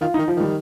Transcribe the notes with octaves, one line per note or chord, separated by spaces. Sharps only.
D#3 F4
D#3 D#4
F3
D#3 G3